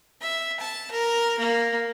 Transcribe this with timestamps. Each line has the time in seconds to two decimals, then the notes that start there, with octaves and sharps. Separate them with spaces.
0.21 E5
0.60 A5
0.91 A#4
1.39 A#3